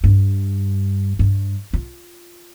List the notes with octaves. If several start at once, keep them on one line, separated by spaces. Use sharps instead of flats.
G2
G2
F4